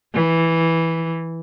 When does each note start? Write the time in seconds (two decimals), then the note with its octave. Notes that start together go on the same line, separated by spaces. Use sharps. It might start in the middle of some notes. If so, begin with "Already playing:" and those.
0.14 E3